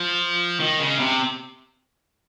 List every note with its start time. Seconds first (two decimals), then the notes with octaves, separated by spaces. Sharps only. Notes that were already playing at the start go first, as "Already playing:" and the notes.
Already playing: F3
0.60 D#3
0.80 C#3
0.99 C3